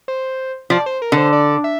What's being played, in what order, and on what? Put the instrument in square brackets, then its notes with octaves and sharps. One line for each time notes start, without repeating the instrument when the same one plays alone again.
[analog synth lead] C5
[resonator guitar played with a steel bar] F3 [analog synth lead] D5
[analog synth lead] C5
A#4
[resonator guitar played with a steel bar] D3
[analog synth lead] C5
D5
E5